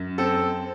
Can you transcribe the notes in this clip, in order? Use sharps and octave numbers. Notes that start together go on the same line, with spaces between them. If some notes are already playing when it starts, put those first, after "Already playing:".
Already playing: F#2
C4 A4